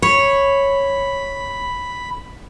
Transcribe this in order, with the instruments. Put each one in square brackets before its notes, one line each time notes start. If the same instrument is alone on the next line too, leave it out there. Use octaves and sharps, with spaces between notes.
[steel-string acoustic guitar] C#5 [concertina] B5